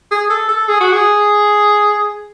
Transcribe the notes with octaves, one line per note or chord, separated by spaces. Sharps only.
G#4
A4
A4
G#4
F#4
G#4